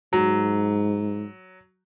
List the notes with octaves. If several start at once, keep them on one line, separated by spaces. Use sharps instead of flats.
G#2 F#3